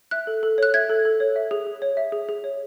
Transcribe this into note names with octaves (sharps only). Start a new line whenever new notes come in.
E5 F#6
A4
A4
C#5 F#6
E5 G#6
A4
A4
C#5
E5
G#4
G#4
C#5
E5
G#4
G#4
C#5